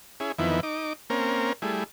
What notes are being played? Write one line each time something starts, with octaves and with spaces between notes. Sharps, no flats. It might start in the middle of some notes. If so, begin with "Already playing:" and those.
C#4 E4 G#4
F2 D#3 E3 B3 E4
D#4 D6
A#3 C4 C#4 A#4
G3 A3 E4 G#4